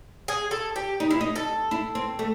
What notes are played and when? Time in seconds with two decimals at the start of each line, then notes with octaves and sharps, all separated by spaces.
0.28 G#4
0.51 A4
0.76 G4
1.00 D#4
1.11 E4
1.21 D#4
1.36 A4
1.71 E4
1.95 C4
2.19 A3